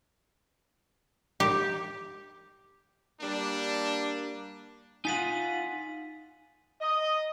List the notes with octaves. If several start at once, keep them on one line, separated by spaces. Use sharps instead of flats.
G4
G3 A#3 D4
D#4 F4 F#5 G#5 B6 D#7
D#5